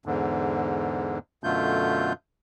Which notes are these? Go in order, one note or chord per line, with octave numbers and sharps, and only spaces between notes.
E2 G#2 D3
F#2 B2 D3 A3 F4 G6